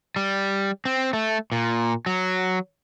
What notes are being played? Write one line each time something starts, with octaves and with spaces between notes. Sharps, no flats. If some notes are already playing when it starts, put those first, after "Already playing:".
G3
C4
A3
A#2
F#3